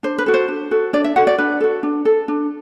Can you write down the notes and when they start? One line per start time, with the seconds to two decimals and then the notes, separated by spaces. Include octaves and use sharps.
0.03 D4 C5
0.18 B4
0.26 F#4 A4
0.34 C5
0.48 D4
0.71 F#4 A4
0.93 D4 D5
1.04 E5
1.16 F#4 A4 F#5
1.27 D5
1.38 D4 B4
1.61 F#4 A4
1.83 D4
2.05 A4
2.28 D4